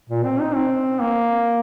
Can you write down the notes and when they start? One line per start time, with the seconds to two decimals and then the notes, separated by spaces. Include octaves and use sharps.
0.09 A#2
0.24 C4
0.40 D#4
0.55 C4
1.01 A#3